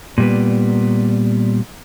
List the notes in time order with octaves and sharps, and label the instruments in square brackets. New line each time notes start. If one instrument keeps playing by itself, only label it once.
[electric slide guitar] A#2 G3 B3